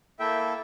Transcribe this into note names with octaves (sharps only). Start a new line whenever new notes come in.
A#3 E4 A4 E5 G5